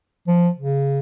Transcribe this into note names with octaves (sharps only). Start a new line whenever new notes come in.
F3
C#3